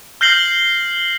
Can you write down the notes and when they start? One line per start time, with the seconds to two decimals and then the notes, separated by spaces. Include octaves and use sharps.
0.21 F6 G6 A#6 C7 F#7 G7